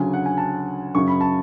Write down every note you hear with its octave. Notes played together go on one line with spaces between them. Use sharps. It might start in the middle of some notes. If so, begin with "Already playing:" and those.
Already playing: D2 C#3 F#3 G#5
F#5
G#5
A5
F#2 C#3 F#3 C#6
B5
A5